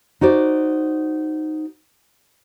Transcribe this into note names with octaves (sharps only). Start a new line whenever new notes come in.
D#4 F#4 C5 D5